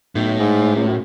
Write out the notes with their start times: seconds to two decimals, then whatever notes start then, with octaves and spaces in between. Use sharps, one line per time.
0.15 B1 A2
0.40 G#2
0.76 C#2
0.88 F#2